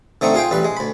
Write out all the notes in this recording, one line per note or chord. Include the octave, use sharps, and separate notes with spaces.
D3 A3 C4 D#4 C#6
F4 G#4 F5 G5
A1 G3 B4
G#3
D2 B5